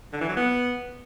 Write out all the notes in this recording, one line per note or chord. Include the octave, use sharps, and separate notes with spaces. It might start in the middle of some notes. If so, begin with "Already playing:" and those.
D3
E3
F#3
B3